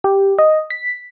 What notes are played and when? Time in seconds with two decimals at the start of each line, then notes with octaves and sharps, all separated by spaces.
0.04 G4
0.39 D#5
0.70 B6